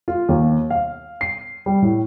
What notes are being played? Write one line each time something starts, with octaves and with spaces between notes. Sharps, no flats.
F4
D#2
F5
C7
G3
A2